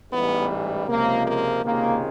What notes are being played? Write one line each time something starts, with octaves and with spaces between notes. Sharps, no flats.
A1 G#2 E3 G3 B3
C#2 C3 F3 G#3 A#3
A#3
C#2 C3 D#3 G#3 A#3